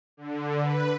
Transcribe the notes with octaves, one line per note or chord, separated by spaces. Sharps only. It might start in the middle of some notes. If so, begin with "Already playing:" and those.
D3
B4